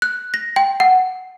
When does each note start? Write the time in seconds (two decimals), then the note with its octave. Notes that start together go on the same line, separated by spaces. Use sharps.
0.02 F#6
0.34 A#6
0.56 G5
0.80 F#5